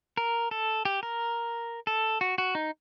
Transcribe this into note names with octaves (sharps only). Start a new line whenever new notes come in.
A#4
A4
G4
A#4
A4
F#4
F#4
D#4